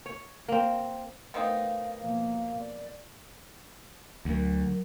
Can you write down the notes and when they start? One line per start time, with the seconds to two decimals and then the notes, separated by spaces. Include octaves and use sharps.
0.06 C#5
0.48 A#3 C4
1.34 A3 B3 C4 D#4 A#4 F5
1.99 B2 F3 A#3 F5
2.60 D5
4.25 D2 F#3 A#4